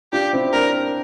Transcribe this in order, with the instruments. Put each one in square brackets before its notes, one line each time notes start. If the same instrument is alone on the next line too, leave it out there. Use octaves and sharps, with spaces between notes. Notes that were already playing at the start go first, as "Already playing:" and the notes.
[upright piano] D4 F4 [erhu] G4
[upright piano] C4 E4
[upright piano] A#3 D4 [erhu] A#4